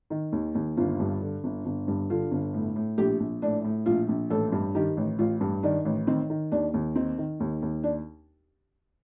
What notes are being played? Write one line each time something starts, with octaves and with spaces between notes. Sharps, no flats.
D#3
D#2
D#2
G1 F4
G2
D3
G1
G1
G2
D3 F4
G1
A2
A2
A#1 G4
A#1
A2 D4
A2
A#1 F4
A#1
A1 A4
G2
D#3 G4
A1
A1 F4
G2
D#3 D4
A1
D#3 C4
D#3
D#2 D4
D#2
D#3 C4
D#3
D#2
D#2
D4